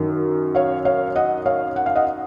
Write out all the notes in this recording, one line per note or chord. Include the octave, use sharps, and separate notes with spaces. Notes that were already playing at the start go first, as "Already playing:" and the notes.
Already playing: F#2 D#3
C#5 F5
C#5 F5
D#5 F#5
C#5 F5
F#5
F5
D#5 F#5